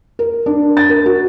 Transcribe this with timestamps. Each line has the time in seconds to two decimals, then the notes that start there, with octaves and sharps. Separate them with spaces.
0.19 A#4
0.46 D4
0.77 A6
0.89 A#4
1.06 F#4